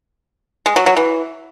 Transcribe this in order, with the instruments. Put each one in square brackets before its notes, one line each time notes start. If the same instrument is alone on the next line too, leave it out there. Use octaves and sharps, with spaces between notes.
[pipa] G#3
F#3
F#3
E3